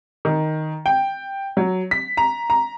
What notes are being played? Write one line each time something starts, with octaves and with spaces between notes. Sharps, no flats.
D#3
G5
F#3
B6
A#5
A#5